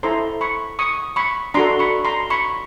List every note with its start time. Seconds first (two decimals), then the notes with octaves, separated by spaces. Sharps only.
0.03 E4 A4 C5 A#5 C6
0.41 B5 C#6
0.79 C#6 D#6
1.16 B5 C#6
1.54 D4 F#4 A4 A#5 C6
1.79 B5 C#6
2.05 A#5 C6
2.30 B5 C#6